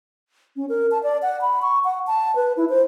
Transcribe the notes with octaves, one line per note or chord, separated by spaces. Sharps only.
C#4
A#4
A5
D5
F#5
B5
C#6
F#5
A5
B4
E4
C5